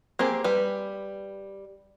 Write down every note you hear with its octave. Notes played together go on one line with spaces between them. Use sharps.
A#3 C4 G4 G#4
G3 B4